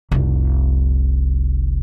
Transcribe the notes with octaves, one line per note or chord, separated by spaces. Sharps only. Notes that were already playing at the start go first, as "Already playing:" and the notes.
F1 C2